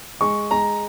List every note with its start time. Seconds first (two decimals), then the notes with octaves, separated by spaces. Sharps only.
0.21 G#3 C#6
0.51 G#3 A#5